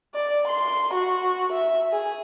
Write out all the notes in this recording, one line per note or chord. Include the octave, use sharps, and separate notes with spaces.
D5
C6
F#4
E5
G#4